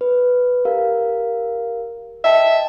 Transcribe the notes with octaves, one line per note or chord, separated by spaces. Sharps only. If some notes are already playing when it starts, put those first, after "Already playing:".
B4
G4 A#4 F5
D#5 E5 G5 A5